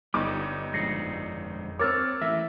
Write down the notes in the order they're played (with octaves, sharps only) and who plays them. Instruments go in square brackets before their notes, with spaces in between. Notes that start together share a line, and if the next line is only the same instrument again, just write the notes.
[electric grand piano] G1 D#4 [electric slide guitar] G3 B3 [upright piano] D6
[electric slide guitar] F2 G#3 D4 [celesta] A#6 C7 C#7
[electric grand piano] C4 C#5 [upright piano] A#4 E6 F6 [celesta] D6 A6
[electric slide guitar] E3 A3 [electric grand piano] E5 [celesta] A#6